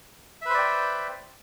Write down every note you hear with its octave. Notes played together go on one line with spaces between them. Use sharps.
B4 C5 D5 E5 G5